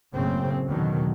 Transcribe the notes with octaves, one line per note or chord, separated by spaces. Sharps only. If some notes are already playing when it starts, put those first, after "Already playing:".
F#1 A2 C#3 C4
E2 B2 D3 D#3 F#3